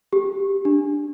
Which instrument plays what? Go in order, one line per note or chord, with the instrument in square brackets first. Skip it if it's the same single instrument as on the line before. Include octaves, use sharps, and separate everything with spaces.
[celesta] G4
D4